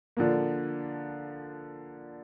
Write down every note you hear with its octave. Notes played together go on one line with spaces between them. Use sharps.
D3 F3 A#3